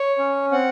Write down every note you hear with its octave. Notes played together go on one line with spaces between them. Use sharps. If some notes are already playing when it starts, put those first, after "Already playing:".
Already playing: C#5
C#4
C4 F#5